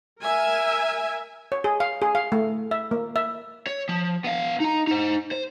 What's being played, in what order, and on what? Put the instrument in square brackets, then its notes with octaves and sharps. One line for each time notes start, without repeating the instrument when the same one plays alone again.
[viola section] A#4 E5 G#5
[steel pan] C#5
G#4
F5
G#4
F5
A3
E5
A#3
E5
[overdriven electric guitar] C#5
F3
B3 F5
D#4 A#5
D#4 C5
C5